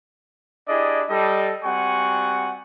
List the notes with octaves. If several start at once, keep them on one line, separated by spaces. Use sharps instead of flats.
D4 E4 G4 G#4 D5 D#5
G3 A4 D#5
G3 C4 F#4 F#5 G#5 C#6